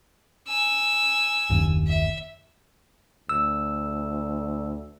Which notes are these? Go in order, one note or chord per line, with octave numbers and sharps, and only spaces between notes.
G#5 E6
F#1 D#2
E5
D2 E6